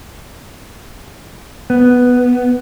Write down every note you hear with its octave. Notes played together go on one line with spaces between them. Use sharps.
B3